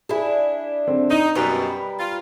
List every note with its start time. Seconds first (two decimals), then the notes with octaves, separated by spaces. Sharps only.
0.09 D4 E4 G#4 E5
0.87 D3 C4
1.10 D#4 D#7
1.35 F#2 B2 G3 B4 A#5
1.99 F4